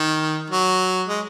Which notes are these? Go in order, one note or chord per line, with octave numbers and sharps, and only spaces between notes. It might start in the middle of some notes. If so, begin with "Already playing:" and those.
Already playing: D#3
F#3
G#3